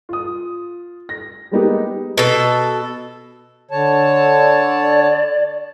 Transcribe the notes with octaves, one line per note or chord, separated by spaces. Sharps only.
F4 D#6
A#6
G3 G#3 A#3 B3 D#4 G4
B2 A4
D3 C#5 A5
D5